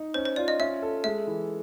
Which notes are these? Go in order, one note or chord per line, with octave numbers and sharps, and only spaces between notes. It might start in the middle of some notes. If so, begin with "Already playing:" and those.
Already playing: D#4
C#4 C5
C5
F4 D5
D#5
C#4 E5
A4
G#3 E5
E3